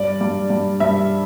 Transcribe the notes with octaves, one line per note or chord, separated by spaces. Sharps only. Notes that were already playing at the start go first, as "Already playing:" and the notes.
Already playing: G2 D5
G2
G2
G2 E5